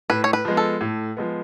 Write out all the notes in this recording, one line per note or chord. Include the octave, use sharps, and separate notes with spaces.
A2 B4
C#5
B4
F3 G#3 B3
A4
A2
F3 G#3 B3